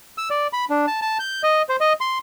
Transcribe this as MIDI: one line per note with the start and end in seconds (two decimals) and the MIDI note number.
0.18 0.29 88
0.30 0.47 74
0.53 0.65 83
0.70 0.86 62
0.87 1.00 81
1.02 1.18 81
1.19 1.42 91
1.43 1.62 75
1.69 1.76 72
1.81 1.93 75
2.01 2.18 84